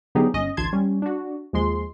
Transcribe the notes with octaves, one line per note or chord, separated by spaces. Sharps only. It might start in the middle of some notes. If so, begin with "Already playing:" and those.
D3 F#3 B3 D#4 G4 G#4
G1 C#4 D#5
A1 D2 A5 C6 G#6
G3 C#4
D4 F#4
D#2 F3 G#3 C6